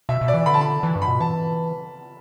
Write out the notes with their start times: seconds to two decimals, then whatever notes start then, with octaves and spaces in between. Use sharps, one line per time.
0.09 B2 E5
0.21 B2
0.28 D5
0.34 E3
0.46 D3 B5
0.54 A5
0.61 B5
0.83 E3
0.96 G2
1.02 B5
1.08 B2
1.20 E3 A5